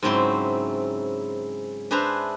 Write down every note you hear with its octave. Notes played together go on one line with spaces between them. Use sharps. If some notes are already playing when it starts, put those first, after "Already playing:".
G#2 C#3 F#3 C4 E4 C6
D4 G#4 B4 C5 E5 A#5